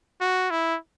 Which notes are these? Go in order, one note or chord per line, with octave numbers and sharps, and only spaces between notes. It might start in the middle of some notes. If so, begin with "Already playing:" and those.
F#4
E4